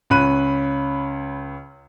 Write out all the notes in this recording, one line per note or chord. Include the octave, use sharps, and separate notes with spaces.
C#2 C#4 B5 F#6 D#7